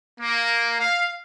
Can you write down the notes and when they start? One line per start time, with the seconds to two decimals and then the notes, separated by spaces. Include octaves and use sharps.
0.21 A#3
0.80 F5